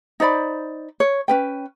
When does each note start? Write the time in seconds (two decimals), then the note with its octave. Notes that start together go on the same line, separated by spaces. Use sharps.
0.20 D#4 C5 D5 B5
1.00 C#5
1.28 C#4 B4 G5